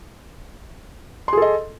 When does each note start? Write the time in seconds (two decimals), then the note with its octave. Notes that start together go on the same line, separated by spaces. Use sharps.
1.28 C6
1.33 G#4
1.37 A4
1.42 D#5